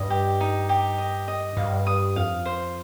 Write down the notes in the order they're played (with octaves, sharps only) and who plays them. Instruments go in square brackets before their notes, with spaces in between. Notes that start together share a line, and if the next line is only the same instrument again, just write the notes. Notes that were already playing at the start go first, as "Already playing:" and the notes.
Already playing: [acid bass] G2 [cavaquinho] D#5
[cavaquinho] G4
D#4
G4
D#5
D#5
[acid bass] G2 [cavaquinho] F5
[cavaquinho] D#6
[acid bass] F2 [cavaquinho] F5
[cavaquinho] C5